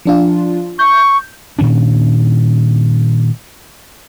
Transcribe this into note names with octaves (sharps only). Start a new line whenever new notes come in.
F3 D4 F4
C#6 G6
A#2 D#3 C#4 D4